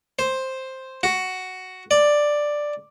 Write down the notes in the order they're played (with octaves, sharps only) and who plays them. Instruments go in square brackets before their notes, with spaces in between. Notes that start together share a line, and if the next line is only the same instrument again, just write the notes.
[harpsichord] C5
F#4
D5